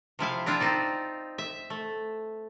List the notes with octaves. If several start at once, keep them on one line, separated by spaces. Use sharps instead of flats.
C3 F3 E4 F5
C4 D4 E4 F4
C4 D#4 D5
E5
A3